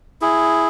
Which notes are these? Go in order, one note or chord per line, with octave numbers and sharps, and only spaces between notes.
E4 G#4